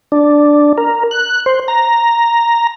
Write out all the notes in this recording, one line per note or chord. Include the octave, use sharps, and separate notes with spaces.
D4
A#4
F#6
C5
A#5